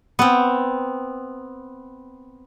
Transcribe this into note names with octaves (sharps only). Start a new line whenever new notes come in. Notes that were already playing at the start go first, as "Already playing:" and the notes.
B3 C4